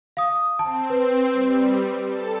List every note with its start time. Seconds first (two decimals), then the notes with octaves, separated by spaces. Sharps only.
0.17 F5 D#6
0.59 C4 A5
0.90 B4
1.33 G3
2.08 A4 A5